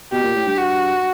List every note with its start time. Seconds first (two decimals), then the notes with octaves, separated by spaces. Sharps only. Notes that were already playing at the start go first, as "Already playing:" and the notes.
0.12 B2 G4
0.23 A#2
0.35 A2
0.46 G2
0.58 F#4